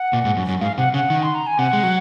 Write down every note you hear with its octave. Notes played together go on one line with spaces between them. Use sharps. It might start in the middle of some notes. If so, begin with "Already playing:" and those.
Already playing: F#5
A#2
G#2
F#2
F#2
G#2 F5
C3 F#5
C#3 F#5
D#3
C6
A#5
G#5
C3 F#5
G#3
F#3